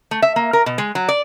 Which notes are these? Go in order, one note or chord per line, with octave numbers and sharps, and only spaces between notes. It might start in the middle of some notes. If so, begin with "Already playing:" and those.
A3
E5
A#3
A#4
B2
G#3
F#3
D5